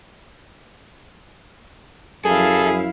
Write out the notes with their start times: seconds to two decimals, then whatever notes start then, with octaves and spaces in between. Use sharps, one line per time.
2.25 F#2 F3 E4 G#4 A4 F5